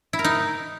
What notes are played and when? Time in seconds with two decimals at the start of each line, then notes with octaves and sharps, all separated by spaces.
0.13 E4
0.19 A#4
0.24 D#4